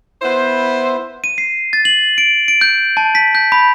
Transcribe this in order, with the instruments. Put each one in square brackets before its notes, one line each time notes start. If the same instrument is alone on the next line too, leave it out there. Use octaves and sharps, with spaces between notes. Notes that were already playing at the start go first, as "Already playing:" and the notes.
[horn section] B3 E4 C5
[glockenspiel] D#7
C7
A6
F#7
D7
D7
G6
A5
B6
G6
B5